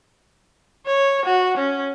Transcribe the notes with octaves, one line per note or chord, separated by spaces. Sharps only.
C#5
F#4
C#4